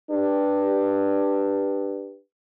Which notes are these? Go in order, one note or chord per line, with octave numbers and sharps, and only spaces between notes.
D4 G4 B4